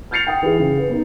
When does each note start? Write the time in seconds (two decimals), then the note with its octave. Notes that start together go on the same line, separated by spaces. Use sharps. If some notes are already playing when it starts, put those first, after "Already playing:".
0.11 F6 G6 A6 C7 C#7 F7
0.27 F#5 G5 D#6
0.43 E3 E4 G#4
0.59 C#3
0.78 B4
0.90 B3 D#4